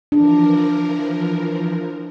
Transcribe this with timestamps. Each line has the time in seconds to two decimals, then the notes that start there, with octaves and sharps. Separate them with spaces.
0.12 E3 F3 D4 A#4